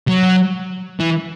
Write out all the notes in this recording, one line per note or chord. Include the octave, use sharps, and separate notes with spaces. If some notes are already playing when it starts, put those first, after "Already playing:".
F#3
E3